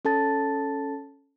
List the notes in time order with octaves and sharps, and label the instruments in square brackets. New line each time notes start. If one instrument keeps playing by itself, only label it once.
[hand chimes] C#4 A4 A5 A6